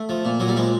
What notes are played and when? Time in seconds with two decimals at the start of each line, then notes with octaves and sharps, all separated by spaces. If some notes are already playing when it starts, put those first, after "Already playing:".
Already playing: A3
0.09 F3
0.25 A#2
0.40 A#2 F#3
0.48 G3
0.56 F3 G#3